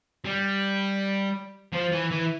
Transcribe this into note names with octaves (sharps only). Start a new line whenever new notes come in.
G3
F3
E3
E3